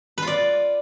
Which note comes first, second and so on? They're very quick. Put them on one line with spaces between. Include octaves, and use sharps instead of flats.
B4 F4 D5